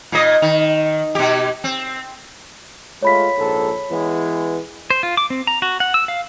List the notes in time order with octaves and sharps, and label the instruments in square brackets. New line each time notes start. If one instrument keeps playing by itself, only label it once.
[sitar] A#2 D#5
D#3
B2 G4
C4
[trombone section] G#3 A3 F4 [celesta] C#5 B5 B6
[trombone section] A#1 G#2 A4
E3 G#3 B3
[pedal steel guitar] C5
F4
D6
C4
A#5
F#4
F#5
E6
F5